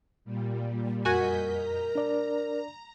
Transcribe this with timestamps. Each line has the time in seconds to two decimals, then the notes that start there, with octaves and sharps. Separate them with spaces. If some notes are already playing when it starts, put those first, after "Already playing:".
0.25 A#2 G3
1.05 F2 F#4 A#4 D#5 G#5 G6 B6
1.51 A#5
1.95 D4 D5